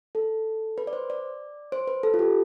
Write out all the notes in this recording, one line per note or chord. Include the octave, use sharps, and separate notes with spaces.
A4
B4
D5
C5
D5
C5
B4
A4
F4
G4